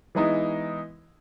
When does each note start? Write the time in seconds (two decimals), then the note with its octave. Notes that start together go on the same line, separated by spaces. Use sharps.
0.15 E3 G#3 B3 D#4 E4